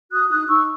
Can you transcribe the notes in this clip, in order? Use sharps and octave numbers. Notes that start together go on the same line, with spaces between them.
F#4 D#6 F#6
D#4 D#6 F#6
D#4 C#6 E6